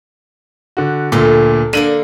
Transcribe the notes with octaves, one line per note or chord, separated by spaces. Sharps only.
D3 F#4
D2 A#2 A4 A#4 C6
D3 A#3 D4 A#4 D#7 F#7